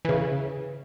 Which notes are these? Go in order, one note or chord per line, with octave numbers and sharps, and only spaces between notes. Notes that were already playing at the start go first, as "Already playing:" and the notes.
C#3 E3